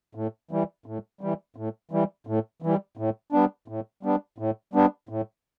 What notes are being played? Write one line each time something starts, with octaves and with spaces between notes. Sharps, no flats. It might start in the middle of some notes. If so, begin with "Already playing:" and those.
A2
E3 G3
A2
E3 G3
A2
E3 G3
A2
E3 G3
A2
G3 B3 D4
A2
G3 B3 D4
A2
G3 B3 D4
A2